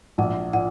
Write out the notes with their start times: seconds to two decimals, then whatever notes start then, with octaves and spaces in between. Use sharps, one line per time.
0.18 A#1 F#5
0.53 A#2 F#5